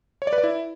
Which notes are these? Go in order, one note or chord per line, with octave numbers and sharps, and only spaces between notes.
C#5
D5
B4
D5
E4